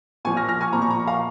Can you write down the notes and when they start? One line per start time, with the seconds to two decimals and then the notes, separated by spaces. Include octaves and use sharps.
0.25 A#2 F3 G#5 C#6
0.37 F6 A#6
0.48 F6 A#6
0.61 G#5 C#6
0.73 A#2 F3 A#5
0.82 C#6
0.91 A#5
1.00 C#6
1.07 F5 A#5